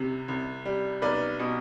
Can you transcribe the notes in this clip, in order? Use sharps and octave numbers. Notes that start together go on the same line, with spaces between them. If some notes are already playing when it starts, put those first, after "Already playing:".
Already playing: C2 C3
C2
G3
B1 B4 D5
B2